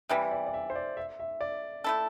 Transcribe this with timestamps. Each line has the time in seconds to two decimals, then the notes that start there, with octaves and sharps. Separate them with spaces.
0.09 C3 E3 G3 E5
0.31 D5
0.46 D5
0.54 E5
0.70 C5
0.75 D5
0.97 E5
1.20 E5
1.41 D5
1.84 A3 E4 A4